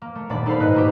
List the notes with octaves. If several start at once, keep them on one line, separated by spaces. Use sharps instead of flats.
A#3
A3
D#1 A#3 D4 D5 B5
D#4 A4 C5 F5 B5
G#2 B4 D#5 F#6
D#4 F#4 G4